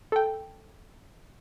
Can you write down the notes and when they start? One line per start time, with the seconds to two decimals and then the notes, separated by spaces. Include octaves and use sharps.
0.12 A4 G5